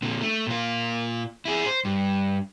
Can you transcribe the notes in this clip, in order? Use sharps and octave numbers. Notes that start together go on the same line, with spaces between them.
A#2 D3
A3
A#2 F4
E4 G#4
C5
G2